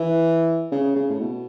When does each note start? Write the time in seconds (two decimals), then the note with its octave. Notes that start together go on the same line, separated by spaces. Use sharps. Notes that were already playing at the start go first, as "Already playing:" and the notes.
Already playing: E3
0.72 C#3
0.96 C#3
1.09 A2
1.20 B2